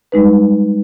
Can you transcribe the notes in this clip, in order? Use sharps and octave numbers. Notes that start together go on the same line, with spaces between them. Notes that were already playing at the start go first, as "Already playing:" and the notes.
G3 G#3 D#4 B4